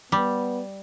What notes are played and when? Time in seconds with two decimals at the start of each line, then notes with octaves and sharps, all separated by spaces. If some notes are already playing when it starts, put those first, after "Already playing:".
0.12 G3 B3